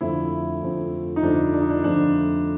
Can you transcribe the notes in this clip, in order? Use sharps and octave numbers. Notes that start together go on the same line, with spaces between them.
F2 D3 F3 A3 C4 E4
F2 D3 F3 A3 C4
D#4
F2 D3 F3 A3 C4 D4
D4
D#4
D4
F2 D3 F3 A3 C4 D4